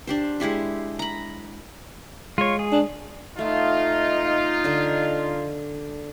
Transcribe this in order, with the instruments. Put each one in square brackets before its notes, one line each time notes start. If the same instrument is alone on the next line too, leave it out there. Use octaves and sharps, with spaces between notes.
[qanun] D4 G4 C5
G#3 E4 G4 E5
A#5 B5
[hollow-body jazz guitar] G#3 [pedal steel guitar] F4 C#5
[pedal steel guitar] G#4
[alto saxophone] D4
[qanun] A3 [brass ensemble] D#4 F4
[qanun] D3 D4